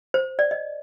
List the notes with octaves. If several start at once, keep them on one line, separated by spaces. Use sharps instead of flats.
C5
D5
D#5